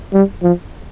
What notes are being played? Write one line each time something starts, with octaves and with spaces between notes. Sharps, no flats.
G3
F3